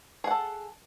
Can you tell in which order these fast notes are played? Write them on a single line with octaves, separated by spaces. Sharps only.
G#4 F#5 A4